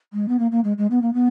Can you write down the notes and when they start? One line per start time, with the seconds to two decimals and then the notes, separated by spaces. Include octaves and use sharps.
0.13 G#3
0.28 B3
0.39 A#3
0.51 A#3
0.64 G#3
0.78 G#3
0.91 B3
1.02 A#3
1.13 B3